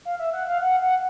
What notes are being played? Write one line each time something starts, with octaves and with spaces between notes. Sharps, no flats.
F5
E5
F#5
F5
F#5
F#5